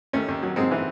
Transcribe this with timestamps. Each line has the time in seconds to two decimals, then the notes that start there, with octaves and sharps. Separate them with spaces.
0.13 D#2 A3 C#4
0.28 D#2
0.43 F#3
0.56 G#2 G#3 C4
0.71 E3